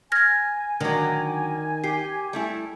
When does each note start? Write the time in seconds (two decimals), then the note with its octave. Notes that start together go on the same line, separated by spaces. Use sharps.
0.12 G#5 F6 G#6 A#6
0.80 D3 D#3 F#3
1.84 G4 C7
2.33 G3 A3 E4